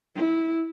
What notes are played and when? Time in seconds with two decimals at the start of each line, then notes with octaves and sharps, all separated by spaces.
0.15 E4